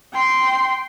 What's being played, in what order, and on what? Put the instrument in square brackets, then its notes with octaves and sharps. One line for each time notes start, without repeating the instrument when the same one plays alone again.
[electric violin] G5 C6